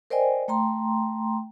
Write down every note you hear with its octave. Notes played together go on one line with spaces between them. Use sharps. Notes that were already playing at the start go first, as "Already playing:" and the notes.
A#4 C5 D5 D#5 G5 G#5
A3 G5 A#5 C6